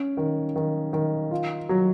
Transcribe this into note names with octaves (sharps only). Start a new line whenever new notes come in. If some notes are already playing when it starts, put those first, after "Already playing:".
Already playing: C#4
D#3
D#3
D#3
F4
F#3